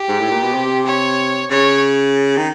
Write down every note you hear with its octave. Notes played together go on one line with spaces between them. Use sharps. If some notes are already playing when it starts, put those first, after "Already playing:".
Already playing: G4
G#2
A2
A#2
B2
C3
C#5
C#3 C#5
D#3